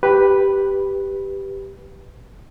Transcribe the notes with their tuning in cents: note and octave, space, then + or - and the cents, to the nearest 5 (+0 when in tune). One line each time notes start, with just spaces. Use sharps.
G4 +0 B4 +0